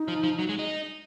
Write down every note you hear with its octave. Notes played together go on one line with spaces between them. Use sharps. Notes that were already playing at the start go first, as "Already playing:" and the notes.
Already playing: D#4
F3
F3
F#3
G#3
D#4